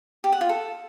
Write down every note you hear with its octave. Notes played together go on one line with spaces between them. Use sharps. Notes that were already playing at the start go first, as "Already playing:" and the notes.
G4
F#5
F4
A4